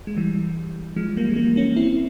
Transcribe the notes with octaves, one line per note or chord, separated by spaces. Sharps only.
G#3
E3 G3
F3 G#3
G3 A#3
G#3
G3 A#3
A#3 C#4
C4 E4